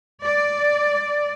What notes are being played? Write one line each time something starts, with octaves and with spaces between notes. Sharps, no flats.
D5